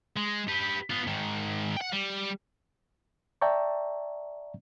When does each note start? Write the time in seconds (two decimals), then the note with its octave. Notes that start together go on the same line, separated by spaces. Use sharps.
0.17 G#3
0.48 G4 B4
0.90 B3 F4
1.07 G#2 D#3
1.77 F#5 G5
1.93 G3
3.41 D5 E5 G5 A5 A#5 C#6